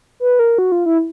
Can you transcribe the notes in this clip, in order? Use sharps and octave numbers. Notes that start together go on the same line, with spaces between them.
B4
A#4
F#4
F4
E4